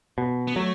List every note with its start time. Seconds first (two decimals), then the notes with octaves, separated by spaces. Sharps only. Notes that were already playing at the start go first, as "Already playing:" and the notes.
0.18 B2
0.47 B3
0.56 F#3 A3